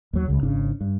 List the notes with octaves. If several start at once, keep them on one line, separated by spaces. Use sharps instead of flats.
D#2 F#3
C#2 C#3
G#1 C#3 D4
G2